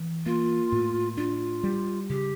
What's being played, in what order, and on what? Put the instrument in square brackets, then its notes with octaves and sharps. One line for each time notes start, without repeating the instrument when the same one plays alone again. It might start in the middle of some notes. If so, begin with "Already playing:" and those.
Already playing: [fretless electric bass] E3
[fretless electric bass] A#3 [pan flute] F4
[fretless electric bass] A2
[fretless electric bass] D4 [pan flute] F4
[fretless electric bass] G3
[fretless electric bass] C#3 [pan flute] G4